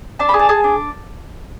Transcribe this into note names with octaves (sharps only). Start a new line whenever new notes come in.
D4 A5
B5
G#4
A5
G#4
D4